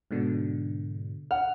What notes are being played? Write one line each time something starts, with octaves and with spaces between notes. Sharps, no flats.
G#2 B2 D3
F#5 F6